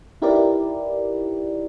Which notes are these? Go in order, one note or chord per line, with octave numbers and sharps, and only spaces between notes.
D#4 E4 G4 A#4 B4 D5